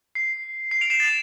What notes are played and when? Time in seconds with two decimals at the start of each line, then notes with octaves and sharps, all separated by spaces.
0.15 C7
0.71 C7
0.81 D7 F7
0.90 C7 E7
1.00 A6